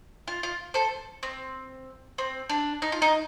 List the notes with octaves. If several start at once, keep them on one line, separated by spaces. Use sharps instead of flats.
F4
F4
A4 C5
C4
C4
D4
D#4
F4
D#4